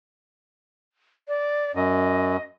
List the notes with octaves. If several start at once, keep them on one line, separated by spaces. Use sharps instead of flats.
D5
F#2 D#5